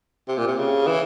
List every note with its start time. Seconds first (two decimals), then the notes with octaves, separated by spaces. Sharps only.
0.28 C3
0.38 A#2
0.48 C3
0.59 C#3
0.87 E3